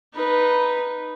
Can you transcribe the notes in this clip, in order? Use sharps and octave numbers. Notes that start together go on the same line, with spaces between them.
D#4 B4